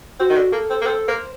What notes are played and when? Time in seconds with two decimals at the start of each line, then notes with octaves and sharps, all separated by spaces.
0.19 C4 F#4
0.30 D#3
0.36 D3
0.52 A#3 A4
0.70 C4
0.82 A#3
0.86 C4 A4
1.08 A#3 C5